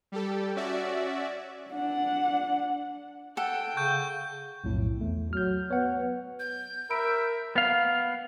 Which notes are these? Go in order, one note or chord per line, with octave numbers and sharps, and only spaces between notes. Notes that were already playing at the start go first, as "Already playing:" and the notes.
G3 G4 A4
C#4 F#4 D5 E5
D4 F#5
A4 F#5 G5
C#3 C#6 G6
B1 F2 A2
E2 A3
F#3 F6 G6
B3 C#5 F#5
G6
A#4 E5 B5 D7
B3 F5